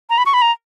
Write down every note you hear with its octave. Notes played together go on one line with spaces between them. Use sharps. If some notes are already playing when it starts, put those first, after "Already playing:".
A#5
B5
C#6
B5
A#5